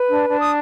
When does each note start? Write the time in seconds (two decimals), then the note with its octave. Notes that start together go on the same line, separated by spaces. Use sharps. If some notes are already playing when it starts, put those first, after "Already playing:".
Already playing: B4
0.09 D4
0.30 D4
0.39 D#6